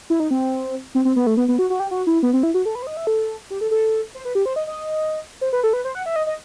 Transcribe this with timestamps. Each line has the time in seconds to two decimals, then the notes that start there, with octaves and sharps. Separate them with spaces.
0.10 E4
0.20 D#4
0.31 C4
0.95 C4
1.05 C4
1.16 B3
1.27 A3
1.37 B3
1.48 B3
1.59 F#4
1.70 F#4
1.80 G4
1.91 F#4
2.07 E4
2.23 B3
2.33 C4
2.43 E4
2.54 F#4
2.65 A4
2.75 B4
2.82 C5
2.87 D#5
2.97 E5
3.07 A4
3.50 G4
3.61 A4
3.71 A4
4.15 C5
4.25 B4
4.35 G4
4.46 C5
4.56 D#5
4.67 D#5
5.41 C5
5.53 B4
5.64 A4
5.73 B4
5.85 C5
5.95 F#5
6.06 E5
6.16 D#5
6.27 D#5